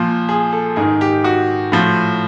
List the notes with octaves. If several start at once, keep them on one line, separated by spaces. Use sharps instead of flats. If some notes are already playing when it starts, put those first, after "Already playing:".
Already playing: A#2 F3
G#4
A4
G#2 D#3 G#4
G4
F#4
A2 F3